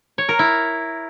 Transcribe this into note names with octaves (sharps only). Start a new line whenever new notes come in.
C#5
A#4
E4